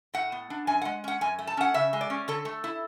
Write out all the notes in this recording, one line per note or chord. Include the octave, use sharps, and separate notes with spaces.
A2 F#5
B3
D4
F#2 G#5
G#3 F#5
C#4 F#5
F#2 G#5
A3
A5
C#4 F#5
C#3 E5
G#3
D5
C#4
D3 A4
A3
E4